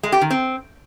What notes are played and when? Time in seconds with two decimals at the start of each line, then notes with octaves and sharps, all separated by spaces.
0.03 G#3
0.12 G4
0.21 D#3
0.30 C4